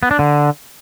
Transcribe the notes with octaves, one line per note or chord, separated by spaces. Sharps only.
B3
D4
D3